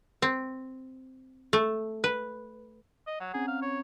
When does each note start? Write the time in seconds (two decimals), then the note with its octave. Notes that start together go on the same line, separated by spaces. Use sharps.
0.22 C4
1.53 A3
2.04 B4
3.07 D#5
3.20 F#3 F#5
3.34 C4 C#4 G#4 A#5
3.48 F5
3.62 C#5